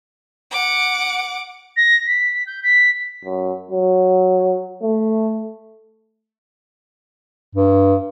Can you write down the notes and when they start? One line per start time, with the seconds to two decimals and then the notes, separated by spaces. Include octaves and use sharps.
0.51 F#5 D6
1.77 A#6
2.07 B6
2.47 G6
2.63 B6
3.25 F#2
3.71 F#3
4.83 A3
7.55 G2